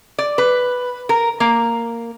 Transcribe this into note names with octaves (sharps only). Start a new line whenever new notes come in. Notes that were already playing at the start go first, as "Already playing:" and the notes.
D5
B4
A#4
A#3